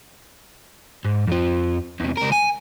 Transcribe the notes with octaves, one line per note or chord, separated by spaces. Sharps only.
G#2
F2 F3
E2 C3
C#2 A#4
G#5